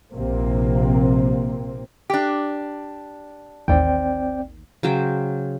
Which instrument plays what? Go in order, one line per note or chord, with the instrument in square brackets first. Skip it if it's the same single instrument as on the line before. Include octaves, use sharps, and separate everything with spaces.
[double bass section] A#1 C3 A#3 C4
[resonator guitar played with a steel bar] D4 G4
[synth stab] A1 D#2 [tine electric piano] C4 D5 G5
[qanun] C#3 F#3 C5 G5